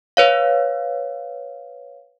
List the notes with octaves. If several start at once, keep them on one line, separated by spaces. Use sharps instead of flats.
B4 C#5 F5